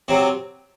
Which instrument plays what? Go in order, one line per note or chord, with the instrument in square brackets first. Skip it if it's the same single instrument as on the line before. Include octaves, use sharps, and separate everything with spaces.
[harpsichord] C3 F#3 C4